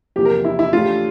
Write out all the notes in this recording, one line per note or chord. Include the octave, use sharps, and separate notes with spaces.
E2 C3 F3 A#3 G4
A#4
E4
E4
A2 E3 A3 D4 F4 G4